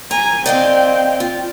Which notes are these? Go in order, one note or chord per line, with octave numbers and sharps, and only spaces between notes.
G#5 A#5
C4 D5 D#5 F5 G5
F4